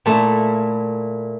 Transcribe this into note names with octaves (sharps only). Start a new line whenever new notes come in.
A#2 A3 E4